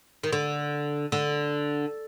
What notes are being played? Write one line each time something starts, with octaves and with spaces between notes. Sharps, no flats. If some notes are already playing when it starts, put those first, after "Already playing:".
D#3
D3
D3